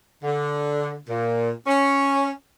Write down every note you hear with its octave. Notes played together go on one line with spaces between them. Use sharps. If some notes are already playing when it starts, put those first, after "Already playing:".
D3
A#2
C#4